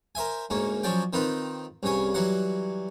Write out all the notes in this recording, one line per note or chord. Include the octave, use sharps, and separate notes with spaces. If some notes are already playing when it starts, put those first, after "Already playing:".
A#4 C5 E5 G#5
D2 G#2 A#3 C#4
F3 F#3 C#4 D5 G5
D#3 C4 D#4 F4 B4
C2 G2 C#3 C#5 G#5
E3 F#3 G3 F#5